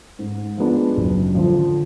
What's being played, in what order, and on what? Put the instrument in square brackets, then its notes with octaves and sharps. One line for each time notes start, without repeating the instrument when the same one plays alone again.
[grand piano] G#2
F3 G#3 B3 D4
F#1
F2 D3 F3